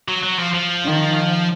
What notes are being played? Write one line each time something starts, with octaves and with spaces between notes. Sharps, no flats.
F#3
F#3
F3
F3
D#3